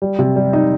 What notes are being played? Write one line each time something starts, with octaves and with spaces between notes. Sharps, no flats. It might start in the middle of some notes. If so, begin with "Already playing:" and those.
G3
C3
G3
D#4